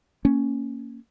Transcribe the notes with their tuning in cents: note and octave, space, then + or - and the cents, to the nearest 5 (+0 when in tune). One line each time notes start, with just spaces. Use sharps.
A#3 -10 C#4 +0